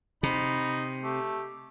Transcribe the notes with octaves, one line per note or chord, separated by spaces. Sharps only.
C3 D#4 B5
A3 G4